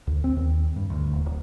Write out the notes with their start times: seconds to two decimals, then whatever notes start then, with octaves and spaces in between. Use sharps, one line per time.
0.07 D2
0.24 C4
0.36 D#2
0.76 G2
0.90 D2
1.13 D#1
1.26 D1